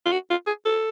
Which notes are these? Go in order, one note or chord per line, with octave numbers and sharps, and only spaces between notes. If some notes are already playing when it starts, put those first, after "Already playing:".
F4
F#4
F4
G#4
A4